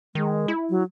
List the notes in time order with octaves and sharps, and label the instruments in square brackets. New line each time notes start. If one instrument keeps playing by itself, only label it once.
[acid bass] D#3 [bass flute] G#3
[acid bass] E4
[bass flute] F#3